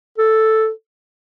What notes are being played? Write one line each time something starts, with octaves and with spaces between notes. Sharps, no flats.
A4